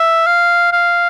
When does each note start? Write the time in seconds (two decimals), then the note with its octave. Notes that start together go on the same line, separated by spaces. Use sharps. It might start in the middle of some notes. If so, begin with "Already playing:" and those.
Already playing: E5
0.27 F5
0.72 F5